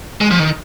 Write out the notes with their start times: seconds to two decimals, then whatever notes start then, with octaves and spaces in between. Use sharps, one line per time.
0.21 G#3
0.30 F3
0.39 D#3